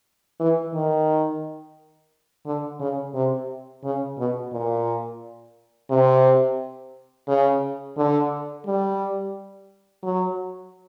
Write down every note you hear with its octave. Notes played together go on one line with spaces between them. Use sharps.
E3
D#3
D3
C#3
C3
C#3
B2
A#2
C3
C#3
D3
G3
F#3